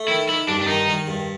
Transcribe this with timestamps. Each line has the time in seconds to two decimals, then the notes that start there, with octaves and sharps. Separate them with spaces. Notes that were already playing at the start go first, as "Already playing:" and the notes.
Already playing: A3
0.08 D#3 E4
0.28 D#3 E4
0.48 G2 D4
0.61 D4
0.67 D#3 D#4
0.88 D#3
1.08 G2